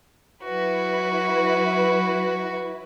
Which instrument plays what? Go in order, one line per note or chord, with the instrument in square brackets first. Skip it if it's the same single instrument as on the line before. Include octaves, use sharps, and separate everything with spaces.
[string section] F#3 E4 B4 [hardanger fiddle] F#4